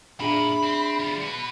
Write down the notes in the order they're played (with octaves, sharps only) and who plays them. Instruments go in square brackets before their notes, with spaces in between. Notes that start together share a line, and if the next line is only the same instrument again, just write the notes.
[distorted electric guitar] A#2 [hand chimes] D4 G#4 E5 [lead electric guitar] B5
[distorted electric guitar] C4
G3 F4
F#4 B4